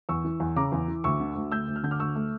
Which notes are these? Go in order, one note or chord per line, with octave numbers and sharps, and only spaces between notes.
E2 C#6 E6
E3
E2
C#3 A#5 D6
E2
E3
D2 C#6 E6
D3
D2
A3 E6 G6
D2
F6
D3 G6
D6 F6
D2 C#6 E6
A3